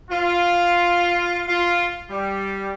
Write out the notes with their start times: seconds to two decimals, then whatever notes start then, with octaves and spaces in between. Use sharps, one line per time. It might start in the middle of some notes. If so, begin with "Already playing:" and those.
0.11 F4
1.48 F4
2.10 G3